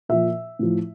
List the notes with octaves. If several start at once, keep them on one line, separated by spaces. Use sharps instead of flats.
A#2 F3 E5
A2 F3